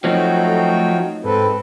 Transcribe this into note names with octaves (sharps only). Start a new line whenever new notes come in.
F3 F#3 A3 C4 D#4 F#4 G5
G#2 C4 A4 B4